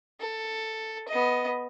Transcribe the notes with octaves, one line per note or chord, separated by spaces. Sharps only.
A4
B3 D#5